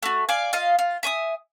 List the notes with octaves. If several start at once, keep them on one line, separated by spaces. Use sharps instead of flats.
A3 F#4
D5 F5 G#5
F4 D#5 F5
F4
E5 G#5 C6 D#6